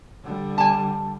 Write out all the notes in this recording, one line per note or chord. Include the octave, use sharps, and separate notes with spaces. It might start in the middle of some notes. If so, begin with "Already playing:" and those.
D3 G3
G#5 A5